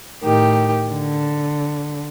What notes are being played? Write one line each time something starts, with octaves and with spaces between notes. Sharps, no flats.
A2 D#3 G4
D3